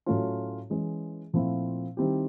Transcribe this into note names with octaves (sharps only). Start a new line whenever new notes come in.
A2 F#3 A3 C#4 F4
E3 G#3 C#4
A#2 F3 A3 C4 E4
D#3 G3 C4 E4 G4